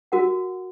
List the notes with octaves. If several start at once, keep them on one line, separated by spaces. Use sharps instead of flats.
F#4 A#4 F#5